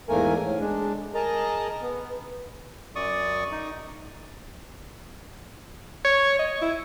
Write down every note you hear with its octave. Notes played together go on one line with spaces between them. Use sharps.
E2 G#2 A3 A#3 A#4 G#5
A2
G#3 D4
G#4 A#4 D#5 A5 A#5
B3
F#2 D5 C#6 D#6
D#4
C#5
D#5
E4